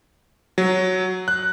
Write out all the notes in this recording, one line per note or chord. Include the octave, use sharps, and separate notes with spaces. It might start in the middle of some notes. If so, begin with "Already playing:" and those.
F#3
F#6